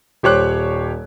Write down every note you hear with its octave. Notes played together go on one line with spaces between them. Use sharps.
D#1 G4 C5 C#5 D6 F#6